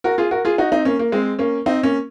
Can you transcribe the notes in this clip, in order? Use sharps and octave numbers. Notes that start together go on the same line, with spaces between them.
F#4 A#4
F4 G#4
F#4 A#4
F4 G#4
D#4 F#4
C4 D#4
A#3 C#4
A#3
G#3 C4
A#3 C#4
C4 D#4
A#3 C#4